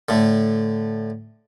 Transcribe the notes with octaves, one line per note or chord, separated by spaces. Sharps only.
A2 D3